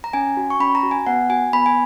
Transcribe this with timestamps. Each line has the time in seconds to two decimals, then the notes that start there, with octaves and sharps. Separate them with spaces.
0.04 A#5
0.13 C#4 G#5
0.37 F#4
0.50 C#6
0.60 C#4 B5
0.75 A#5
0.83 F#4
0.91 G#5
1.06 B3 F#5
1.30 F#4 G#5
1.53 B3 B5
1.66 G#5